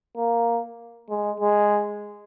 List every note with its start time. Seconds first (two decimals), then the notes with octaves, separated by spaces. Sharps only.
0.17 A#3
1.09 G#3
1.40 G#3